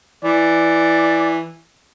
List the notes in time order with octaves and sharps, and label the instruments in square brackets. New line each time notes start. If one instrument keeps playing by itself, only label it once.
[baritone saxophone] E3 [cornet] D5